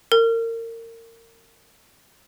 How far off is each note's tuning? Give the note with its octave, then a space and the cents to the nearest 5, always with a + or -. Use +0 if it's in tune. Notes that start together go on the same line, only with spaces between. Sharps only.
A#4 -30